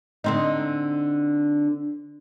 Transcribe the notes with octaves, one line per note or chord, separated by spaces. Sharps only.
D3 C4 D#4